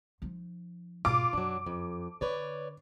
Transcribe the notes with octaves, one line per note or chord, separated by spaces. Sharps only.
F3 D#4
G#2 B2 F4 D6
F#2 F#3 D4
F2
D3 B4 C#5 D5